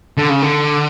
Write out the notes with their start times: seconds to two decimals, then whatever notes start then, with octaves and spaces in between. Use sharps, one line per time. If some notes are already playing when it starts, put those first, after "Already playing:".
0.17 D3
0.30 C#3
0.42 D3